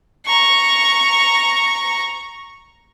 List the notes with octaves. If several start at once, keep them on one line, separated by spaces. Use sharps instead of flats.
A#5 C#6